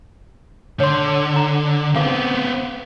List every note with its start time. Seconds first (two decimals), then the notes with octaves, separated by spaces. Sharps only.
0.80 D3 C#5 C6
1.36 A#5
1.96 B3 C4 G#4 F5